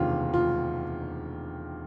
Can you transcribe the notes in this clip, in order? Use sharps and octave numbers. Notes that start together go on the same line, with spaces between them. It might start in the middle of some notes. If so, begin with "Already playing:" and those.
Already playing: E1 D2 C3 D#3 F4
F4